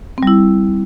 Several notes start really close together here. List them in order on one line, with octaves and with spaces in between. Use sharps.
C4 G3 E4